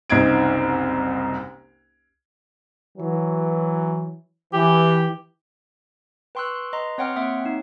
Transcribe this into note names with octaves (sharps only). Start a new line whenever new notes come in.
F#1 C2 D#4 G#6 D7
E3 F#3
E3 G4
B4 G5 C6 C#6 E6 F#6
C6
B4 D#5 A#5 C6
C4 C#5 F#5 G5 C6 F6
A#3 C4 C#5 E5 F#5
D#4